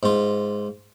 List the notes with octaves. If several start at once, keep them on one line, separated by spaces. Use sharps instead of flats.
G#2 F4